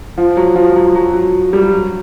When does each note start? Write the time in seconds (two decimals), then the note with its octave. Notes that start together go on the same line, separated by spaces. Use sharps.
0.18 F3
0.37 F#3
0.56 F3
0.75 F#3
0.95 F#3
1.13 F#3
1.53 G3
1.72 F#3